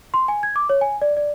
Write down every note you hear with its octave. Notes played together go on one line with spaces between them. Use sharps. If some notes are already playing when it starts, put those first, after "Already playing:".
C6
G#5
G#6
D6
C#5
G#5
D5
D5